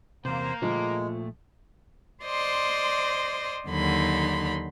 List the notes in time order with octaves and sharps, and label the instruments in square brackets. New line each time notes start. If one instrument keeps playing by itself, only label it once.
[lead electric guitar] E2 C3 [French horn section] A#3 [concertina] C5
[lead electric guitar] A#2 A3 [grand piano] F3 [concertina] G#3
[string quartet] C5 D5 D#5 C6
D#2 D3 F#3 D#4 B5 C6